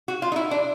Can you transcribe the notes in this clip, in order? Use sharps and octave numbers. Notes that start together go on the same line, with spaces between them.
F#4
F4
D#4
E4
D4